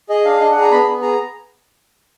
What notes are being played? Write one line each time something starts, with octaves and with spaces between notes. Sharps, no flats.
G#4 D#5
D4 F5
D4 D#5
G#4 F#5
A#5
B3 B5
B3
G#4 A#5